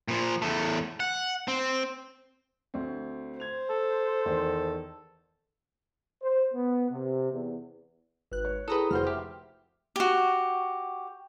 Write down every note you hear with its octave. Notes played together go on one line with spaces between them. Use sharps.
A#2 F3
E2 A3
F#5
C4
D2 C4
C5 G#6 F7
A4
E2 D#3 C6
C5
B3
C3
E2
G#1 B4 F#6
C#5
E4 G#4 A4 B4 G5 A#5 D#6
F1 F#4 C5 G5 C6 F6
G4 E5
F#4 G4